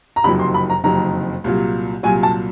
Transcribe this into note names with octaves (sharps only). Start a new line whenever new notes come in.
A#5
F#1 F2 C3 D#3 F#3 B5
C6
B5
A#5
F#1 F2 C3 D#3 F#3 A#5
C2 A#2 F#3
C2 A#2 F#3 G#5
A5